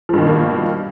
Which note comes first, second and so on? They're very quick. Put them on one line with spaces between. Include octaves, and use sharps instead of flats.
F3 G2 D#3 B2 A#3